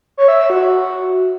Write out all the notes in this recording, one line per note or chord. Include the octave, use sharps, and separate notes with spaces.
C#5
E5
E5
F#4